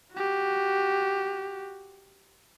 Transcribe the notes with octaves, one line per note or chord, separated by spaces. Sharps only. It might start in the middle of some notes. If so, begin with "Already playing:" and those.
F#4 G4